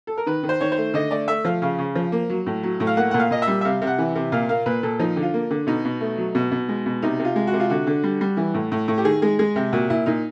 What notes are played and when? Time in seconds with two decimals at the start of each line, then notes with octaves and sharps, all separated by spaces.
0.07 A4
0.17 A#4
0.26 D#3 B4
0.43 D#3
0.49 C5
0.61 D#3 C#5
0.72 C5
0.78 A3
0.94 D3 D#5
1.11 A3 D5
1.28 A3 E5
1.45 F3 F5
1.62 C#3 F5
1.78 C#3
1.95 F3
2.12 A#3
2.29 F#3
2.46 A2
2.63 F#3
2.80 A2
2.87 F5
2.97 A#3 F#5
3.11 A#2 F#5
3.20 F5
3.31 A#2 D#5
3.42 E5
3.48 G3
3.61 E5
3.65 C3 F5
3.82 C3
3.87 F#5
3.99 E3
4.15 C3
4.32 A#2 F5
4.49 A#3 F5
4.66 A#2 B4
4.83 A#2 A4
4.99 F3 D#4
5.16 D3
5.22 F4
5.34 A#3
5.50 D3
5.67 B2 D#4
5.85 B2
6.01 A3
6.18 F#3
6.35 B2
6.52 B2
6.69 G#3
6.86 B2
7.02 C3 D#4
7.19 C3
7.25 F4
7.36 G#3
7.47 F#4
7.53 C3
7.60 F4
7.70 D3 F#4
7.87 D3
8.04 G3
8.21 G3
8.37 E3
8.54 A2
8.72 A2
8.88 A2
8.98 G4
9.05 D#3 G#4
9.22 G#3 G#4
9.39 G#3 G#4
9.56 C3 G4
9.73 A#2 F#4
9.90 A#2 E4
10.06 A#2 D#4